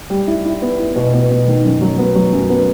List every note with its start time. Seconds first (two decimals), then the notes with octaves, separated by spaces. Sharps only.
0.10 G3
0.27 E4
0.45 E4
0.62 B3
0.79 E4
0.96 B2
1.13 B3
1.30 B2
1.47 D#3
1.65 F#2
1.81 F#3
1.98 B3
2.15 F#3
2.33 F#2
2.50 B3